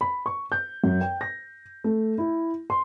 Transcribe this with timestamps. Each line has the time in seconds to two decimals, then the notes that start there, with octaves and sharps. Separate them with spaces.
0.01 B5
0.26 C#6
0.52 G6
0.84 F#2
1.01 G5
1.21 A#6
1.84 A3
2.18 E4
2.70 C6